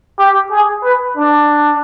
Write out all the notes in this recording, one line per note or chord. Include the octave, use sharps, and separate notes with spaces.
G4
G#4
B4
D4